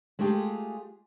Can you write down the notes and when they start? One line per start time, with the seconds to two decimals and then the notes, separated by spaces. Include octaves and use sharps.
0.19 G#3 A3 F4 G4 G#4